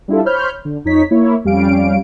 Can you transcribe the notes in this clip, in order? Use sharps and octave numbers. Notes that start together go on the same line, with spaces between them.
G3 D4 E4 F4 A4
C5 C#5 B5 F6 G6
D3
F2 D#4 C#5 B6
A#3 E4 C#5
F2 G3 C#4 F5 D7